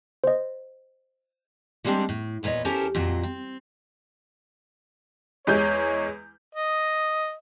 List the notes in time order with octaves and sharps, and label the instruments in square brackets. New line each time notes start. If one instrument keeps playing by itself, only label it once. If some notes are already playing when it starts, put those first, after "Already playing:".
[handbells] C5 D#5
[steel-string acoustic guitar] G3 G#3 A#3 C4 D4
A2
E2 A#2 B4 C#5 D#5
C#4 E4 G4 A4 A#4 C5
F2 A#2 F#3
C4
[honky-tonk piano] E2 G#3 G6 [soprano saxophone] C#5
[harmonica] D#5